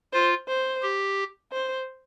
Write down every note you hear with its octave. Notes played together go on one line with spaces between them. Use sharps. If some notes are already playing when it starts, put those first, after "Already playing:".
F4 C5
C5
G4
C5